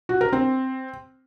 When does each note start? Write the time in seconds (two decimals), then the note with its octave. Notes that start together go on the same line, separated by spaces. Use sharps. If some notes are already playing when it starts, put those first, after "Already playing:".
0.09 F#4
0.21 A#4
0.33 C4